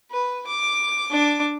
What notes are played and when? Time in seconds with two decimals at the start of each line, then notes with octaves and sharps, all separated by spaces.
0.11 B4
0.47 D6
1.10 D4 D6